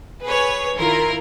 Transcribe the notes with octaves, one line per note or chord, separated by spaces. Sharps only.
G#4 B4 C#5
D#3 E4 F4 A#4